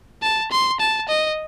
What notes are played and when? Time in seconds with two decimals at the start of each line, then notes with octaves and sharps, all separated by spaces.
0.22 A5
0.51 C6
0.80 A5
1.08 D#5